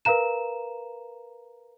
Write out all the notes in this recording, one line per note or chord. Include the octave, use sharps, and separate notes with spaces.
A#4 B4 F5 A#5 E7